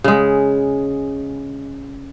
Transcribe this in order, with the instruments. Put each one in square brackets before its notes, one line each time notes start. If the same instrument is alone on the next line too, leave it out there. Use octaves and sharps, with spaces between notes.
[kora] C#3 G#3